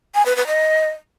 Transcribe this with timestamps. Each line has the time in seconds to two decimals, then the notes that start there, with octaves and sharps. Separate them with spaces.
0.15 G#5
0.26 B4
0.36 B4
0.47 D#5